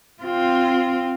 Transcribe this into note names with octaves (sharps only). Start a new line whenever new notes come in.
C4 F4